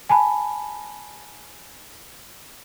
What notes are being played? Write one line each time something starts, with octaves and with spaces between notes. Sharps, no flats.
G#5 A5 B5